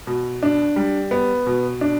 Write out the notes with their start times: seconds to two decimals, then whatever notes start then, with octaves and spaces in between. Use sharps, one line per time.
0.07 B2
0.43 D4
0.76 G3
1.11 B3
1.46 B2
1.81 D4